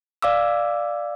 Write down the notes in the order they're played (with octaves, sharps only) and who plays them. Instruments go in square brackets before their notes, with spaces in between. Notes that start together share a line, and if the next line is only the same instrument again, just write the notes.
[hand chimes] D5 F5 D6 E6